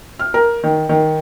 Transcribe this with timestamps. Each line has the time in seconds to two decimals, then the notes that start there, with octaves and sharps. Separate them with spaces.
0.19 F6
0.34 A#4
0.64 D#3
0.89 D#3